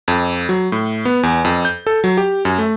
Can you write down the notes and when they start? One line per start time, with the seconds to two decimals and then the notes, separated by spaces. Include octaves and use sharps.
0.08 F2
0.49 F#3
0.72 A2
1.05 B3
1.23 E2
1.45 F2
1.65 G6
1.87 A4
2.04 F#3
2.17 G4
2.45 F#2
2.59 A3